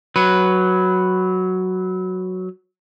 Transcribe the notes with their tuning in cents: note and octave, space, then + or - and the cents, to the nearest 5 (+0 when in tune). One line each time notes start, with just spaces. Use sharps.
F#3 +0 B4 +0